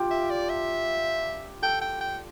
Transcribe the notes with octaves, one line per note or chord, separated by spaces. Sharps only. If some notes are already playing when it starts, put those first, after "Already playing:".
Already playing: D4 F4 G4
E5
D5
E5
A4 G5
G5
G5